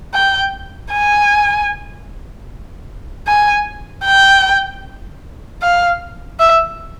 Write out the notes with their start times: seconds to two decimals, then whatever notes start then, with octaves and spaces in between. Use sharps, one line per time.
0.14 G5
0.93 G#5
3.27 G#5
4.05 G5
5.62 F5
6.40 E5